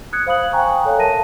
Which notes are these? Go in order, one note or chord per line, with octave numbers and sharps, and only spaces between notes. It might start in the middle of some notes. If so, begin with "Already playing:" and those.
D#6 F#6 G#6 C#7
C5 F5 B5 D#6 F#7
F5 G5 G#5 A#5 C#6 F#6
A4 C#5 F5 A#5
A#4 E5 A5 A#6 D#7